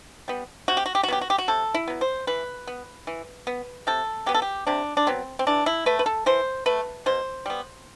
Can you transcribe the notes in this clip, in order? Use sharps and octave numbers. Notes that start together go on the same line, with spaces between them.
G3 B3
C3 F#4
G4
F#4
G4
F#4
F#3 B3 G4
F#4
G4
F#4
C3 A4
E4
F#3 B3
C5
E3 B4
B3
E3
B3
C3 A4
F#3 B3 G4
A4
G4
C3 D4
D4
F#3 B3 C4
C4
E3 D4
E4
A3 B4
B4
A4
E3 C5
A3 B4
B2 C5
G3 B3